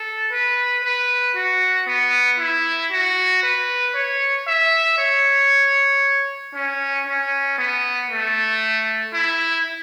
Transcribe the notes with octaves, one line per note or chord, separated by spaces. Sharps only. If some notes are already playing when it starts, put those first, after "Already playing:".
Already playing: A4
B4
B4
F#4
B3
E4
F#4
B4
C#5
E5
C#5
C#4
C#4
B3
A3
E4